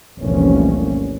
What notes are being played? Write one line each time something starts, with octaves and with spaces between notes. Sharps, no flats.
F1 C2 A#2 E3 C#4